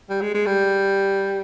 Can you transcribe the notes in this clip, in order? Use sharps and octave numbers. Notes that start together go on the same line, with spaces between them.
G3
G#3
G#3
G3